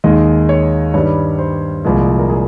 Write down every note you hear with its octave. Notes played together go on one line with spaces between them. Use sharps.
D#2 D#3 G#3 D#5
C#5
G2 D#3 G3 C#5
C5
C2 A#2 F3 G#3
A#4
G#4